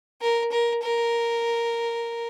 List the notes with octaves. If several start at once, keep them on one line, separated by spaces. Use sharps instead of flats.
A#4
A#4
A#4